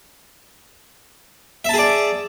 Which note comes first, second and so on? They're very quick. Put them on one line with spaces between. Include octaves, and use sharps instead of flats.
E5 A5 G#4 D5